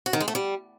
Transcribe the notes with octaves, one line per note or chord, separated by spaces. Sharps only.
F#4
D#3
G#3
A3
G3